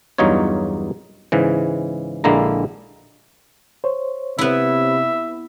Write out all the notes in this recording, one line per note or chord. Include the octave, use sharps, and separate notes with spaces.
E2 G2 F#3 D#4 F4 C#5
G#2 C#3 E3
A#1 D3 G#3 A#3 E4 A#5
C5 C#5
C3 B3 E4 E5